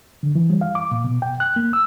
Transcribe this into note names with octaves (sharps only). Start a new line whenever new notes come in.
D3
E3
G3
F5
D6
A#2
B2
G5
F#6
A#3
E6